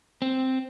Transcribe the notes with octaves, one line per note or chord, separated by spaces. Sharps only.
C4